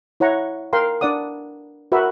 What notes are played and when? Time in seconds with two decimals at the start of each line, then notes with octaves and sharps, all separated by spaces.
0.20 E4 C#5 F#5 A#5 C#6
0.73 A#4 F5 G5 C6
1.01 D4 B4 D5 F#5 D#6
1.92 F#4 A#4 B4 E5